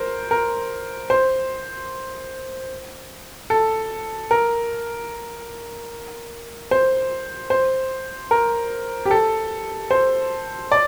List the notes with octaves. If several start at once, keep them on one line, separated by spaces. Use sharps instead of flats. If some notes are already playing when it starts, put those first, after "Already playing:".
Already playing: A#4 C5
A#4
C5
A4
A#4
C5
C5
A#4
G4
A4
C5
D5